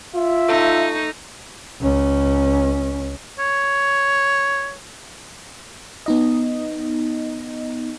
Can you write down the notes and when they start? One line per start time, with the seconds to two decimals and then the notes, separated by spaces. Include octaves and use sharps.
0.15 F4 E5
0.49 A3 D#4
1.80 C#2 C#4
3.39 C#5
6.06 B3 D#4 D#5